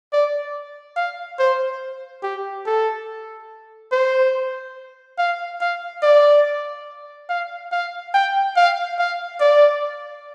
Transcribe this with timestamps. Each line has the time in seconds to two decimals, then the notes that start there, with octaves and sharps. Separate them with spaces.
0.13 D5
0.97 F5
1.39 C5
2.23 G4
2.66 A4
3.92 C5
5.18 F5
5.61 F5
6.03 D5
7.29 F5
7.72 F5
8.14 G5
8.56 F5
8.99 F5
9.41 D5